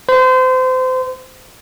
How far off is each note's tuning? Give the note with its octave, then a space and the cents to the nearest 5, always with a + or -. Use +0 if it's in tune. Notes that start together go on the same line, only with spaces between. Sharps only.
C5 -30